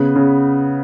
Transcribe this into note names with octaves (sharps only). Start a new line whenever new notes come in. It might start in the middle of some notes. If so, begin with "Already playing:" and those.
Already playing: C#3 B3
C#3